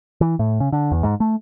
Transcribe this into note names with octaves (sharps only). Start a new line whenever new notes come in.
E3
A2
C#3
D3
E2
G#2
A3